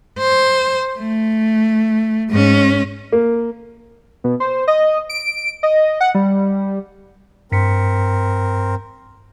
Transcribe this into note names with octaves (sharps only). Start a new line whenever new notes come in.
C5
A3
G#2 C#4
A#3
B2
C5
D#5
D7
D#5
F#5
G3
G2 C4 A#4 B6 C#7